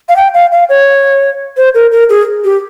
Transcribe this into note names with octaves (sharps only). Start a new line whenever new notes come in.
F5
G5
F5
F5
C#5
C5
A#4
A#4
G#4
G4